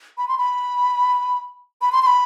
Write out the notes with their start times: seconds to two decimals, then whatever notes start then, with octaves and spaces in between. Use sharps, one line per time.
0.18 B5
0.28 C6
0.38 B5
1.81 B5
1.92 C6
2.02 C6
2.06 B5